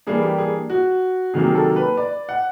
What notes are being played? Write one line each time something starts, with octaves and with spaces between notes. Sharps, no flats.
E3 G3 A#3 D4 G#4
G4
G#4
F#4
C3 D#3 F#3 A#3 G#4
G#4
A4
B4
D5
F#5